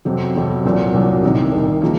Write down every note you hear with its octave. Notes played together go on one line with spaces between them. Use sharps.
F2 C3 F#3 C4
F2 C3 F#3 C4
C2 A#2 F#3
C2 A#2 F#3
C2 C3 D#3
C2 C3 D#3
C#3 F3 A#3